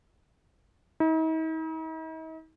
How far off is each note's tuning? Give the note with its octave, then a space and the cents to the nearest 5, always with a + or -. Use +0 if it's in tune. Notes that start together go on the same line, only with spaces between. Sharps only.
D#4 +45